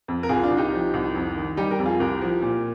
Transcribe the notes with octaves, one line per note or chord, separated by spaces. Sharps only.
F2
A#4
C2 F4 G#4
D4 F4
C2
D#4 G4
F3
C2
F2
D#3
G3 D#4 G4
G4 A#4
F2
F4 G#4
C2 G4 A#4
F3
A#2